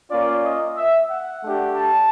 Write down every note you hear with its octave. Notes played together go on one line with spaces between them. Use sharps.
A#3 C#4 F4 D5
D#5
E5
F#5
A3 D4 G4
A5